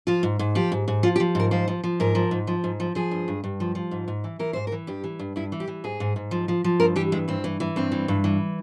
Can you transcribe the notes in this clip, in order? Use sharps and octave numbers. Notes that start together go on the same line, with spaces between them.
F3 F4
G#2
G#2
F3 G4
G#2
G#2
F3 F4
G4
F3
G#2 A#4
F3 C5
F3
F3
G#2 A#4
F3
G#2
F3
G#2
F3
F3 G#4
G2
G2
G2
F3
F3
G#2
G#2
E3
E3 A#4
G#2 C5
A#4
E3
G2 G4
E3
G2
G2 E4
E3
G4
E3
G#2 G#4
G#2
G#2
F3
F3
F3
G2 A#4
E3 G4
G2 G#3
G2 C4
E3
E3
G2 C4
E3
G2
E3